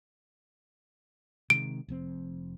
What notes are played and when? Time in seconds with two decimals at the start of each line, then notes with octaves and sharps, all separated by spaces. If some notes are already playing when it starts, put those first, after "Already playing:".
1.50 C3 D#3 G#3 D7
1.88 F1 F2 C4